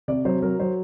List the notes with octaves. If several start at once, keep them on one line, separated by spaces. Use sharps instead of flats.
C3 D5
F#3 C5
F#3 A#4
F#3 C5